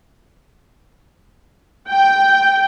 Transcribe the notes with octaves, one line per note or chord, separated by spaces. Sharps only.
G5